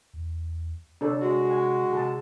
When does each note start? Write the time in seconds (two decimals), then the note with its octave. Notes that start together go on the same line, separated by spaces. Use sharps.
0.13 E2
1.01 C3 D4 A4 C#5
1.21 G#3 F#4
1.51 G#5
1.93 C3 G#4 A5